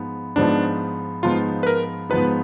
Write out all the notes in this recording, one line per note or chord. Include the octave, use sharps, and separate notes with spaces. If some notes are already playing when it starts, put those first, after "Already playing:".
Already playing: G#2 F3 B3 D#4
G#2 F3 B3 D4 D#4
G#2 F3 B3 D#4 F4
B4
A#4
G#2 F3 B3 D#4 B4